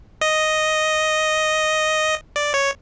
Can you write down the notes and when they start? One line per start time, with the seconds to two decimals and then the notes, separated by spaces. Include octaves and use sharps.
0.21 D#5
2.36 D5
2.54 C#5